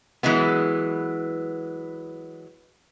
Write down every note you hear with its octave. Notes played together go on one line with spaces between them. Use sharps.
E3 F#3 G#3 B3